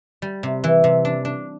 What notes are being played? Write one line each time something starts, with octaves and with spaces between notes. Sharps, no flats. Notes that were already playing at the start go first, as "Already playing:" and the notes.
G3
C3
E3
C3
D4
D4